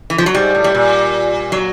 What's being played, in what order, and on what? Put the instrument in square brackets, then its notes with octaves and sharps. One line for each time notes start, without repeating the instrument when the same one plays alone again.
[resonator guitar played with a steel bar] E3
F3
F#3
[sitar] G#2 [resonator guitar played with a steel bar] G3
[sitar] A2
[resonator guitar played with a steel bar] G3
[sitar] A#2
[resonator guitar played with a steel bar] F#3